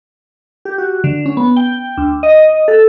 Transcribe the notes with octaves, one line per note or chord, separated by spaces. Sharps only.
G4
F#4
D3
C#4
B3
G5
D2
D#5
A4